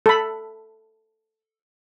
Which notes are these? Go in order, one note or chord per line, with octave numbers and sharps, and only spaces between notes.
A4 B5